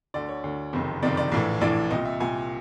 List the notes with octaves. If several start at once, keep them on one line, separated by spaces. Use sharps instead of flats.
D2 D3 D5
C#5
D2 D3
F#1 F2 C3 D#3
F#1 F2 C3 D#3 D5
D5
A#1 A2 E3
A#1 A2 E3 D5
C2 A#2 D#5
E5
C2 A#2 G#5